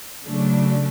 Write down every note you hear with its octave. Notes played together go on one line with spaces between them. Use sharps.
C#3 F#3 A3 D4